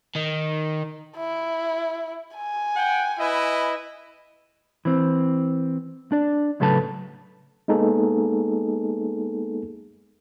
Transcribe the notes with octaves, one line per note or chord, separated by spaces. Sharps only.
D#3
E4
G#5
F#5 G5
E4 B4 D#5
E3 C4
D4 D5
A2 C#3 F#3 A4 B4 A5
G#3 A#3 B3 D#4 G#4 A4